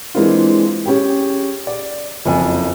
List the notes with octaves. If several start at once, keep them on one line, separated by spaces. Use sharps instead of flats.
E3 G#3 A#3 C4 D4 F4
C#4 G4 G#4 G5
D5
F#1 F2 G#5